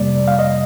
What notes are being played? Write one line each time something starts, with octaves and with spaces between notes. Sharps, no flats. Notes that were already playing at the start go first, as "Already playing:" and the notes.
Already playing: F2 C3 G3 A#3 D5
F5
D#5